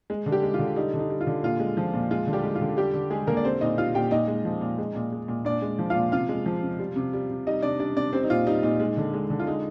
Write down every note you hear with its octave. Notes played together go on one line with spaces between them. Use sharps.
G#3
D3
G3 G4
G#3
F4
D3
G3 D#4
D3
D#4
G3
F4
D3
A#2 F4
G#3
F3
A#2
G#3 F4
D3
G3 G4
G#3
F4
D3
G3 G4
D3
G3 G#3 G#4
D3 A#3 A#4
D5
G3 C4 C5
A#2 D#4 D#5
G3 F4 F5
A#2 G4 G5
A#2 D#4 D#5
G#3
F3
A#2
G#3
A#2
G#3
A#2
A#2 D4 D5
G#3
F3
A#2 F4 F5
C3 F4 F5
G#3
F3
C3
G3
C3
G3
C3
G3 D#4 D#5
C3 D4 D5
G3 D4 D5
C3 D4 D5
G3 C4 C5
D#4
A#2 F4
G3 D#4
A#2 D#4
G#3
D3
G#3
D3
F4
G#3 D#4